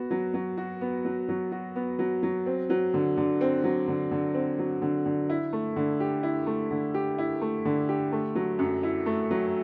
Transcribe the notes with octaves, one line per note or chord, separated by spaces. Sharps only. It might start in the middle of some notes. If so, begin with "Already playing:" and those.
Already playing: B3 F#4
F#3
F#3
F#4
B3
F#3
F#3
F#4
B3
F#3
F#3
C4
F#3
D3
D3
C4
F#3
D3
D3
C4
F#3
D3
D3
E4
A3
D3
G4
E4
A3
D3
G4
E4
A3
D3
G4
A3
F#3
F#2
E4
A3
F#3